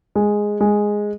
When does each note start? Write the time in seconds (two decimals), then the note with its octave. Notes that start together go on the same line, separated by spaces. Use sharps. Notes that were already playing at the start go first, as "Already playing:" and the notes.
0.15 G#3
0.61 G#3